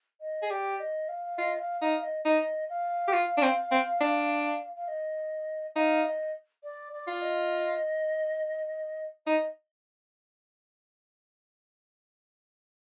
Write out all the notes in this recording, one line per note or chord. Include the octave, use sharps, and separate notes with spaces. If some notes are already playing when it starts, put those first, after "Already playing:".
D#5
G#4
G4 D5
D#5
F5
F4 D#5
F5
D#4 F5
D#5
D#4 D#5
F5
G4
F4
D4
C4
C4
D4
F5
D#5
D#4 F5
D#5
D5
D5
F4
D#5
D#4 D#5